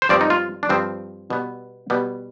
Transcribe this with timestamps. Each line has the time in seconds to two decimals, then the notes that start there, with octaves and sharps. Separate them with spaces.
0.02 C5
0.09 G2 F3 C4 D5
0.21 D#4
0.30 F4
0.63 D4
0.69 G2 F3 C4
1.30 B2 G3 B3
1.90 B2 G3 B3